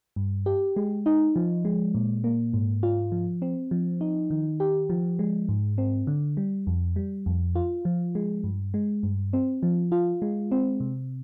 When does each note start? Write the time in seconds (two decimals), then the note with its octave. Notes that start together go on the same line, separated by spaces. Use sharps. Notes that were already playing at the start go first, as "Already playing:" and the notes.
0.16 G2
0.46 G4
0.76 G#3
1.06 D#4
1.36 F3
1.65 G#3
1.95 A#2
2.24 A#3
2.54 G#2
2.83 F4
3.12 F3
3.42 C4
3.71 F3
4.01 D#4
4.31 D#3
4.60 G4
4.90 F3
5.19 G#3
5.49 G#2
5.78 C4
6.07 D3
6.37 G3
6.67 F2
6.96 G3
7.26 F2
7.55 F4
7.85 F3
8.15 G#3
8.44 G2
8.74 G#3
9.03 G2
9.33 C4
9.63 F3
9.92 F4
10.22 G#3
10.51 C4
10.80 C3